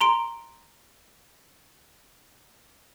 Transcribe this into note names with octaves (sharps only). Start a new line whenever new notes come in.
A#5 C6 D7